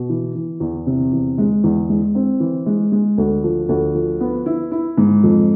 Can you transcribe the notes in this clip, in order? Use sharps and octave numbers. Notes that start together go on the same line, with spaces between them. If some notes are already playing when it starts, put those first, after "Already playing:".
Already playing: B2
E3
E3
E2
C3
E2
G#3
E2
G#3
C4
E3
G#3
G#3
D2
F3
D2
F3
B3
E4
E4
G#2
F2